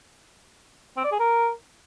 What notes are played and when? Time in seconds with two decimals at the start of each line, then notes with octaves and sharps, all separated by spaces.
0.97 C4
1.04 D5
1.12 G#4
1.19 A#4